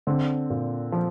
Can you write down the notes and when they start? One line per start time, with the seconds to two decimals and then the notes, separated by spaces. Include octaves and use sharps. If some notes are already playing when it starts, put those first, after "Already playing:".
0.07 D3 C4
0.50 A#2
0.92 F3